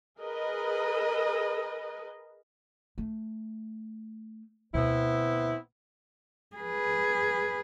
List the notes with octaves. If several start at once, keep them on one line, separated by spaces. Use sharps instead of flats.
G#4 A#4 B4 D#5
A3
D2 B2 B3 C4 E4
G#4 B4